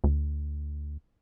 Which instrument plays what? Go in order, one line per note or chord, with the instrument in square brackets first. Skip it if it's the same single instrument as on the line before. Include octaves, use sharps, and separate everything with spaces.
[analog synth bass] D2